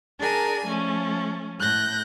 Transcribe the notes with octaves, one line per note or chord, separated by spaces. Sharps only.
D4 G#4 A#4 D5 G#5
F3 A3 C#4
A2 F#6 G6 A#6